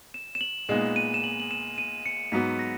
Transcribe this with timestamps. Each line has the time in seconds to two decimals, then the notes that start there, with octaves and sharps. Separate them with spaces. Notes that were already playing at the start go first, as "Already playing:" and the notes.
0.14 E7
0.35 E7
0.41 F#7
0.69 A#2 G#3 B3 D#4 E7
0.96 D#7
1.14 E7
1.24 F#7
1.40 F#7
1.51 E7
1.78 D#7
2.06 C#7
2.32 G#2 F#3 B3 F#4 B6
2.59 A#6